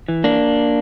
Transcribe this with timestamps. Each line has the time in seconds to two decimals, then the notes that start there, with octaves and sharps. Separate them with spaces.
0.08 E3
0.24 A#3 D4